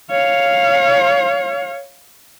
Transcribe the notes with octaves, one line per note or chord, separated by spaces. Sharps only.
C#5 F5